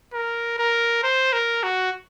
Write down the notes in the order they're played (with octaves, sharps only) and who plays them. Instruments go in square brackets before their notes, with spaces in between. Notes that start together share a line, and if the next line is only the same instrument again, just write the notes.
[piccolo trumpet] A#4
A#4
C5
A#4
F#4